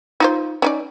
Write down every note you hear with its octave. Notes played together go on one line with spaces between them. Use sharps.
D#4 F4 C5
C#4 D#4 D5